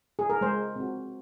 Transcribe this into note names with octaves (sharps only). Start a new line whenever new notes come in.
G#4
A#4
G#3 C5
C4 F#4